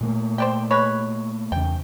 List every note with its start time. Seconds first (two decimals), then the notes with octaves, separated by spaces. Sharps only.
0.01 A#2 A3 A#3
0.38 C5 D5 G5
0.71 G#3 B4 C#5
1.52 E2 C#3 G5